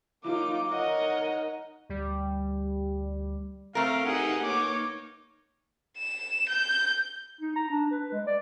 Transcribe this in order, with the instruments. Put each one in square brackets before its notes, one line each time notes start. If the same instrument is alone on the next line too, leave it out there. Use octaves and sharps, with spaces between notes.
[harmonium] F#3 A#3 [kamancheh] D#4 D6 [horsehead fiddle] F4
[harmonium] D#4 [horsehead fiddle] A#4 F#5 [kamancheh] C#5 D#5
[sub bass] D2 [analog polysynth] G3
[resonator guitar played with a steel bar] A3 A#4 [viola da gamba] C4 [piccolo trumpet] F5
[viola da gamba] D#4 G4 B4 [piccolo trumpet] G#4 [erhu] F#5
[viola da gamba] A#3 D#4 [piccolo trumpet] C#5 [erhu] D6
[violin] E7
G6
[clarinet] D#4
A#5
D4
B4
G#3
D5